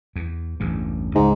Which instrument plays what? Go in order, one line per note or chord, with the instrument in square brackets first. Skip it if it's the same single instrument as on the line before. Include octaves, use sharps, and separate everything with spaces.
[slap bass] E2
A1 E2 G2
[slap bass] C#2 [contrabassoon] G#2